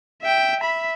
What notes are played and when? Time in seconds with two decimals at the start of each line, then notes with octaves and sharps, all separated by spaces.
0.22 E5 G5
0.60 E5 B5